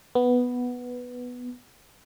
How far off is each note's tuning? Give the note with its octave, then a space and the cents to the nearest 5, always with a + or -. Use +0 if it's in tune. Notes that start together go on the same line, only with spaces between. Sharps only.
B3 +0